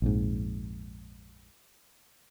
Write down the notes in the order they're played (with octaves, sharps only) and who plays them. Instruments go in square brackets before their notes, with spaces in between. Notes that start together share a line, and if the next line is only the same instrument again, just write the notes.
[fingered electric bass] A#1 F2 G#2